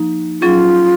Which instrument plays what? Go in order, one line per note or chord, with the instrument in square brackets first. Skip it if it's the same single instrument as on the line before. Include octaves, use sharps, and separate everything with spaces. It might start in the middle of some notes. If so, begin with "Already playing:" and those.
Already playing: [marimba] F3 A#3 D#4
[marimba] F#3 C#4 G#4 [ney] F4